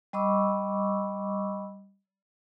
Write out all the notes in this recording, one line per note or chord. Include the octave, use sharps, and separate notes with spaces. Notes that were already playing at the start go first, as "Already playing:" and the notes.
G3 D#5 B5 C#6 D6 E6